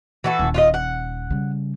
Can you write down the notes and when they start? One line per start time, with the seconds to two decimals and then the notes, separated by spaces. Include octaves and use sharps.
0.24 E3 F#4 A4
0.39 D#1
0.54 F4 F#4 D#5
0.74 F#5
1.30 C#3 G3